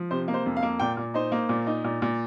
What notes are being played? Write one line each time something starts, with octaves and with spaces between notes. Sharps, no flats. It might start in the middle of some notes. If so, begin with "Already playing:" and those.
Already playing: F3
C3 C5
A#3
C5
F2
F5
A#3
A#2 G5
A#2
D#4 C5
A#3
A#2
D#4
A#2
A#2